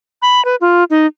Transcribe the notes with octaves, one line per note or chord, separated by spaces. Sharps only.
B5
B4
F4
D#4